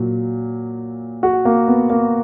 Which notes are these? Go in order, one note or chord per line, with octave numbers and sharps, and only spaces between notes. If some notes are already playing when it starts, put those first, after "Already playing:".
Already playing: A#2 F#3
F#4
A#3
B3
A#3